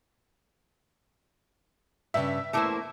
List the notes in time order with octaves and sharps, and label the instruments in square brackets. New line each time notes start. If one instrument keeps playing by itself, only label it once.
[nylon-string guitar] G2 C#3 [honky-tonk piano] E5
[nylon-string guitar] E2 C5 [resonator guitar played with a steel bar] A3 A#3 E4